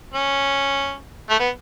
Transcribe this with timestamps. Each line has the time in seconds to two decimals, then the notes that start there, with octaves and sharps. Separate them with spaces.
0.14 C#4
1.30 A3
1.40 B3